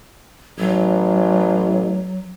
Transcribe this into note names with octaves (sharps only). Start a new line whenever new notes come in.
A1 F#3